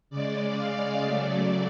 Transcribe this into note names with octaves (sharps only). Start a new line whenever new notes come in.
C#3 G#3 D5
F5
C#3 F#3 A3 D5